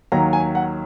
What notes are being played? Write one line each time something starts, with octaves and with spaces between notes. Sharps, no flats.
D#2 D#3 F#3 A#5
G#5
F#5